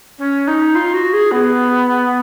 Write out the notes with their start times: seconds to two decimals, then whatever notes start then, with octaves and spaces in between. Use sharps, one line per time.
0.18 C#4
0.47 D#4
0.75 F4
0.93 F#4
1.13 G#4
1.31 B3